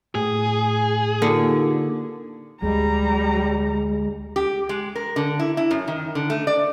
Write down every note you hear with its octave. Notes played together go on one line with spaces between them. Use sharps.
A2 G#4
D3 A#3 D#4 F4 G4
D2 D3 G3 G#3 A#5
G4
G#3
A#4
D3
E4
E4
F#2
D#3
D3
A3
D5